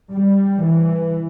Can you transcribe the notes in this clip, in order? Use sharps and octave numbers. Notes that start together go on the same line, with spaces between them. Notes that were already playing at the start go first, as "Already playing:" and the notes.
G3
E3